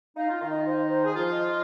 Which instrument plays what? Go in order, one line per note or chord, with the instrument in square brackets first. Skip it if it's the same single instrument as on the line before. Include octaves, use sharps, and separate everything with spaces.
[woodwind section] D#4 [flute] F5
[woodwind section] F4
[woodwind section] D#3 D#4 [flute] F5
[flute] D#5
C5
C5
[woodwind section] G#4
F3 F4
[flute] D#5
D#5